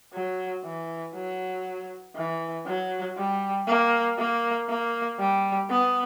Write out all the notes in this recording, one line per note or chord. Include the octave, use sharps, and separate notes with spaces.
F#3
E3
F#3
E3
F#3
G3
A#3
A#3
A#3
G3
B3